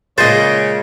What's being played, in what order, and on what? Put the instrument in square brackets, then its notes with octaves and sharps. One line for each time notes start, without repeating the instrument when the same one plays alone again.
[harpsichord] A#2 G#3 [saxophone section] C#3 [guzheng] C5 D#5 [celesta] A6